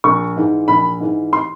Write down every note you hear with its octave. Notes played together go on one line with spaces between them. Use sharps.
A#1 C#6
G#2 E3
A#1 B5
G#2 E3
C6